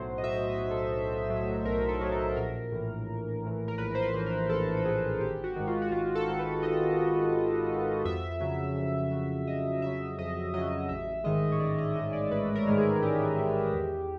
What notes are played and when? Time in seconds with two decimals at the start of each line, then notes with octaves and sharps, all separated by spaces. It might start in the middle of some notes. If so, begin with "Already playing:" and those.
Already playing: B1 A2 F#3 C5
0.18 D#5
0.23 B1 E5
0.47 D#5
0.58 A2 F#3
0.71 A4
0.94 B1
1.30 A2 F#3
1.65 B1 A#4
1.89 A4
2.01 A2 F#3
2.12 A4
2.36 A#1 A#4
2.72 A2 E3
3.07 A#1
3.43 A2 E3
3.68 A#4
3.78 A#1 B4
3.95 C5
4.02 B4
4.14 A2 E3
4.26 A#4
4.49 A#1 A4
4.77 A4
4.85 A2 E3 G#4
5.20 G#1 G4
5.44 F#4
5.56 G#2 D#3
5.67 F4
5.82 F#4
5.91 G#1 F4
6.15 A4
6.28 G#2 D#3
6.39 B4
6.63 G#1 D#5
6.99 G#2 D#3
7.33 G#1
7.69 G#2 D#3
8.04 F2 E5
8.40 C#3 F#3
8.76 F2
9.11 C#3 F#3
9.47 F2 D#5
9.82 C#3 F#3 E5
10.18 F2 D#5
10.54 C#3 F#3 D#5
10.89 A1 E5
11.24 G#2 D#3 G#3 D#5
11.52 C#5
11.59 A1 D5
11.78 D#5
11.95 G#2 D#3 G#3 D#5
12.13 D5
12.31 A1 B4
12.55 A#4
12.67 G#2 D#3 G#3
12.78 G#4
13.02 A1 G4
13.37 G#2 D#3 G#3
13.73 E2